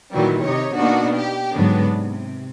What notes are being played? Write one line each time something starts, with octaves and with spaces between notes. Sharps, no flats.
A#2 D#3 E3 F#3 G3
C3 D#4 G4 C#5
B2 A#3 B3 D4 D#4 F#4
G4
G#2 D3 F#3 B3 D4
C3